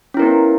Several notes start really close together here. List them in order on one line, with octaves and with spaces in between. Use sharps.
C#4 E4 A#4 B3